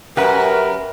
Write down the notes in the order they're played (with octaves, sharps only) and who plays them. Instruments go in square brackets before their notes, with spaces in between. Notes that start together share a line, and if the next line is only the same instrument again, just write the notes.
[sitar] F#2 [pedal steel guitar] G4 F#5 B5 [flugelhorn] A#4 [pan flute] B4